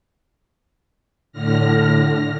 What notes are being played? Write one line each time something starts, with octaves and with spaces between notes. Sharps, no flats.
A2 D3 F6 A#6